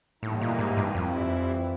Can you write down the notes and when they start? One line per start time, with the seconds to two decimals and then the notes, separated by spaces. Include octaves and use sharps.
0.23 A2 E3 G3 A#3 D#4
0.41 A#2
0.59 G#2
0.77 G2
0.94 F2 E3 G3 C4 E4